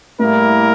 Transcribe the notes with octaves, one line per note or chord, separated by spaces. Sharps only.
A2 G3 A#3 E4 A#4